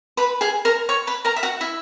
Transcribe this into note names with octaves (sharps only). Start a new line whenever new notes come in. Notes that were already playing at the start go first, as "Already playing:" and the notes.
B4 B5
G#4 G#5
A#4 A#5
C#5 C#6
B4 B5
A#4 A#5
E5
F#4 F#5
E4 E5